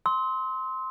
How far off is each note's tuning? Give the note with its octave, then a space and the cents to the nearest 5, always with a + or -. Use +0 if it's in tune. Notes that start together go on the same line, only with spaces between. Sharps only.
C6 +0 E6 -45